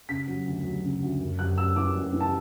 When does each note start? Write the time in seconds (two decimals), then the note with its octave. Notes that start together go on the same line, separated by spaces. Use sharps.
0.09 C#3 B6
0.28 F#3
0.46 D2
0.65 F#3
0.83 C#3
1.02 D2
1.20 F#2
1.39 F#2 F#6
1.57 F#2 E6
1.76 E3 D6
1.95 F#2
2.13 E3
2.20 A5